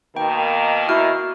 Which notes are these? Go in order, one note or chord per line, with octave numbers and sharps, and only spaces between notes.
B2 D#3 A#3 G5
E4 F#4 F6